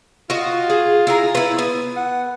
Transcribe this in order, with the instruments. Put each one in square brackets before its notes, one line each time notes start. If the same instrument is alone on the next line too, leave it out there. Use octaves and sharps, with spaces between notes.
[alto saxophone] F4 [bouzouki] F#4 D#5
[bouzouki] G#4
E4 G#4 A#5
E4 B4
B3
[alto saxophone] F#5